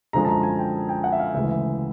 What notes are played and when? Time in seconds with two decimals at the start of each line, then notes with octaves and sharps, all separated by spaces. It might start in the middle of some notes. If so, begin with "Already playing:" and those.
0.13 F#2 D3 F3 G#3 A#5
0.25 A5
0.28 A#5
0.43 G#5
0.59 G5
0.89 G5
1.04 F#5
1.12 E5
1.20 F5
1.34 D2 C#3 E3 G#3 E5